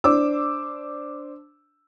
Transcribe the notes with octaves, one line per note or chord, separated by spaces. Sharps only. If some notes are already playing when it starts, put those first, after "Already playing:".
D4 C5 D6 E6